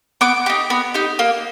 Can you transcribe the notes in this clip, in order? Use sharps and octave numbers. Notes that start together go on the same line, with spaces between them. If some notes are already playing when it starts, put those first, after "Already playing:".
B3 D6
D#4 G4
B3
D#4 G4
A#3